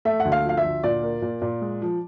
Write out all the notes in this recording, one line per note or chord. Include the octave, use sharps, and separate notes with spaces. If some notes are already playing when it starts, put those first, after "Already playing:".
A3 E5
F#5
D2
F5
F3
F5
E5
D2
A#2 D5
A#3
A#2
A#2
G#3
F3